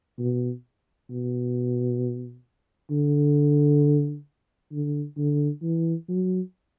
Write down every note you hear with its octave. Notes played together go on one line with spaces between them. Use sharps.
B2
B2
D3
D3
D3
E3
F#3